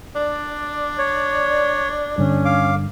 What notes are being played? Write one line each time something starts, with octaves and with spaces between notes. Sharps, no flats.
D4 D5
C#5
G2 D3 C#4
F5 D6